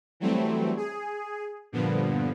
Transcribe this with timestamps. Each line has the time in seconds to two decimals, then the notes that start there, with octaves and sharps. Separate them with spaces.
0.20 E3 F#3 G3 A3 C4
0.77 G#4
1.72 G2 A#2 D3 F3 B3